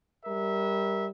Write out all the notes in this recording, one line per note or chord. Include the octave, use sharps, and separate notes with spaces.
G3 A#4 E5